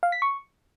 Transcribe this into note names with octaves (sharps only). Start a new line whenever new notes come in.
F5
B6
C#6